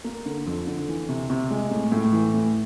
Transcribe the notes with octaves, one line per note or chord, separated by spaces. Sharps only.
A#3
D3
F2
D3
E3
C3
C3
G#3
A2
A2
E3
A2